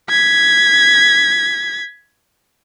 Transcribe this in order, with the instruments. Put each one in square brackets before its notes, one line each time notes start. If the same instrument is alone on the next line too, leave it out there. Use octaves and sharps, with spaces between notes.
[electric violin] G#6 B6